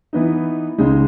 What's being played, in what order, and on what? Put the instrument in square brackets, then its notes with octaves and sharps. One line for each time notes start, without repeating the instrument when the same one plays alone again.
[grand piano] E3 B3 D#4
C#2 C#3 G#3 D#4